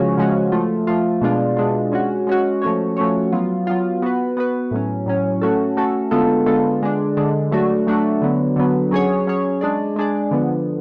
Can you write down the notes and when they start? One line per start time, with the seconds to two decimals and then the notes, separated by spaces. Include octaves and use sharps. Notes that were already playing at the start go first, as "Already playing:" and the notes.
Already playing: C#3 F3 G#3 C#4 F#4
0.17 C#3 F3 G#3 C#4 F#4
0.52 F3 A3 F4
0.87 F3 A3 F4
1.22 B2 G#3 D4 F4
1.57 B2 G#3 D4 F4
1.92 G#3 C#4 F#4
2.27 G#3 C#4 F#4
2.62 F3 A3 C#4 F#4 C#5
2.97 F3 A3 C#4 F#4 C#5
3.32 F#3 B3 F4
3.67 F#3 B3 F4
4.02 B3 F#4 B4
4.37 B3 F#4 B4
4.71 A2 F#3 C#4
5.06 A2 F#3 C#4
5.42 A3 C#4 F#4 A4
5.77 A3 C#4 F#4 A4
6.11 D3 G#3 B3 F4 A4
6.46 D3 G#3 B3 F4 A4
6.82 D3 G#3 D4
7.17 D3 G#3 D4
7.51 F#3 A3 D4 F#4
7.87 F#3 A3 D4 F#4
8.22 D3 F#3 B3
8.56 D3 F#3 B3
8.91 F#3 C#4 G#4 C#5
9.27 F#3 C#4 G#4 C#5
9.61 G#3 D4 G#4 D5
9.96 G#3 D4 G#4 D5
10.31 D3 F3 B3